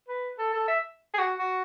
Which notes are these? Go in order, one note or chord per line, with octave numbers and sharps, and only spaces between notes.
B4
A4
A4
E5
G#4
F#4
F#4